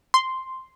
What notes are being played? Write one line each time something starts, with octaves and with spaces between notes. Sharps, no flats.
C6